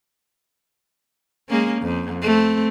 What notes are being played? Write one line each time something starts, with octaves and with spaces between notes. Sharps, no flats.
G#3 A#3 C#4
F2
A3 C4